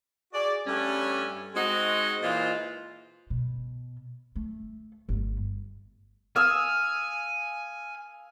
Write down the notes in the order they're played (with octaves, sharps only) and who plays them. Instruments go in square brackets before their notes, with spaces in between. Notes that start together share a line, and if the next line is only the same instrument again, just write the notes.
[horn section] F#4 G#4 D5
G2 G3 A3 C#4
G#3 C4 D#4 F#4
A#2 E3 G#3 F4 C5
[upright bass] B2
A3
G1 A3
[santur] F5 D#6 E6 [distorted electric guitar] G#5